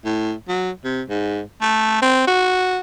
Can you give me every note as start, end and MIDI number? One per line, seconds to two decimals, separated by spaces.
0.05 0.33 45
0.48 0.71 54
0.84 1.02 48
1.10 1.41 44
1.62 2.01 57
2.02 2.27 60
2.28 2.80 66